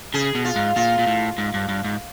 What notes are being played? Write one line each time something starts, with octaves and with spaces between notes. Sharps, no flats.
C#3 G#4
B2
F4
G#2
A#2 F4
A#2
A2
G#2
G2
G2
G#2